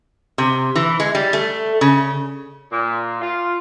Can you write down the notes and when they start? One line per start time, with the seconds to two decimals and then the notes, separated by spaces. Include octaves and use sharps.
0.38 C3
0.75 E3
1.00 G#3
1.15 G3
1.33 A3
1.81 C#3
2.71 A#2
3.21 F4